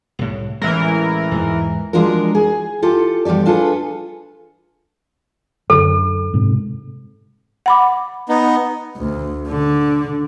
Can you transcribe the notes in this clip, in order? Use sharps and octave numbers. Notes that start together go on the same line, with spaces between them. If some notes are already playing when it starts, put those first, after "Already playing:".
C2 A2
A1 E3 G#3 A#4
E2 G#2
F3 G#3 D4 F4 F#4 A#4
G#4
F4 G4 A4
F3 G3 B3 G4 D5
D4 F4 G#4 A4 B4
F#2 D3 A4
G#2 C3
F#5 B5 D6
B3 D#4
D2
D3